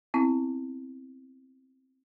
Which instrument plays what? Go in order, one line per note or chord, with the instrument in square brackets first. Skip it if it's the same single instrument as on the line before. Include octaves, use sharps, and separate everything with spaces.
[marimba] B3 C4 E4